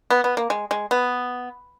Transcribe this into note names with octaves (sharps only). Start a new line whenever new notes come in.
B3
B3
A#3
G#3
G#3
B3